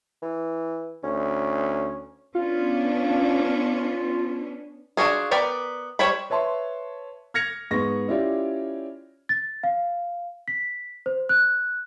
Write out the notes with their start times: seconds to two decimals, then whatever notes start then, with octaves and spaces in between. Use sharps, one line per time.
0.22 E3
1.04 D2 C#4
2.35 B3 C#4 D4 F4
4.97 D4 F4 F#4 G#4
5.31 B3 A#4 D5 G5 B5
5.99 G3 C5 C#5 G5 B5
6.30 B4 C#5 E5 A5 C6
7.34 F6 G#6 A#6 C#7 F7
7.71 G#2 B3 C#6 A#6
8.08 C#4 E4 F4 G4 D5
9.29 A6
9.63 F5
10.48 B6
11.06 C5
11.29 F#6